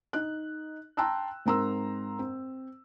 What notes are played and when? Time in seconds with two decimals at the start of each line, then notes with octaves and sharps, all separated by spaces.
0.13 D#4 F#6
0.97 G5 A5 A#5 C6 E6 F#6
1.46 G#2 C4 A#4 A#5 C6 E6
2.19 C4